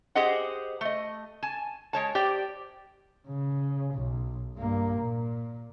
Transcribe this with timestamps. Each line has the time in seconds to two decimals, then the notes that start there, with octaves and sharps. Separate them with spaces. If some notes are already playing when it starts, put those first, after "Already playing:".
0.15 G4 G#4 C5 D#5 F#5
0.81 A3 D#5
1.43 G#5 A5
1.93 G#3 C#5 A5
2.15 G4 C5 D5 G5
3.28 C#3
3.94 B1
4.57 G2 A#3
4.99 A#2